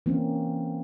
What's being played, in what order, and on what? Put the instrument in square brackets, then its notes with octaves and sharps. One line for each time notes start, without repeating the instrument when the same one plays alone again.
[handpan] E3 A#3 C4 C#4